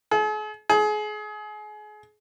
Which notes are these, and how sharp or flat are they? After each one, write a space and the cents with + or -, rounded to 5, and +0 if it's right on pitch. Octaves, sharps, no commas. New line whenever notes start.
G#4 +45
G#4 +30